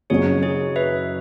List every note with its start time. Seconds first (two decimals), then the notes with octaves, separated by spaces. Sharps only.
0.10 F#1 F#2 F#3 C#4 G#4 C#5
0.43 G#4 C#5
0.76 B4 E5